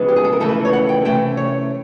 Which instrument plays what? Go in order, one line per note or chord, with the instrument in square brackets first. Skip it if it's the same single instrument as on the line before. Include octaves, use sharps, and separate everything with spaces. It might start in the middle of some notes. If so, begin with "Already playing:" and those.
Already playing: [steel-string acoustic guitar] F2 C#3 E3 G#3 B3
G4
G#4
A4
A#4
F2 C#3 E3 A3 A4
B4
C#5
F#5
G5
C3 E3 A3 C#4 G5
C#5